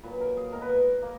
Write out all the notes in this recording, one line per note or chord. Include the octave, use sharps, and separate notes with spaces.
A#2 F#3 A#3 B4
A#4
G#4
B2 G#3 A#4
B4
A#4
A#3